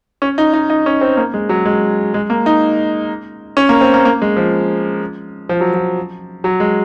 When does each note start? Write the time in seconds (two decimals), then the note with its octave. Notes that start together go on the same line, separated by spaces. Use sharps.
0.22 C#4
0.38 D#4
0.54 D#4
0.70 D#4
0.86 C#4
1.01 C4
1.17 A#3
1.34 G#3
1.49 F#3
1.66 G#3
2.14 G#3
2.30 A#3
2.46 D#4
3.57 C#4
3.69 A#3
3.81 C4
3.94 A#3
4.05 A#3
4.22 G#3
4.36 F3
5.49 F3
5.61 F#3
5.74 F3
6.44 F#3
6.60 G#3